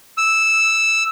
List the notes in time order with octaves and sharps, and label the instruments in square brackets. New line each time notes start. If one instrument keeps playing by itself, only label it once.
[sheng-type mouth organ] E6